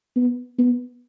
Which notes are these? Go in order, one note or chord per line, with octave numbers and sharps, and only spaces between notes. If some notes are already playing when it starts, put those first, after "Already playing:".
B3
B3